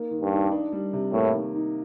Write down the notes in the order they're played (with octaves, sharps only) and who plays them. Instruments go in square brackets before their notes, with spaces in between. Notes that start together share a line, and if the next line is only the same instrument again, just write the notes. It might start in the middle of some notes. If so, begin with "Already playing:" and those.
Already playing: [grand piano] A#3 D#4
D#3
[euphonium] G2
[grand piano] D#4
D4
G3
C3
[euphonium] A2 [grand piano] A#3
[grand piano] D#3
D#4